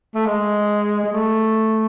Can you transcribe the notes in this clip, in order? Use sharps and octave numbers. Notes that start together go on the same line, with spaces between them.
A3
G#3
G#3
A3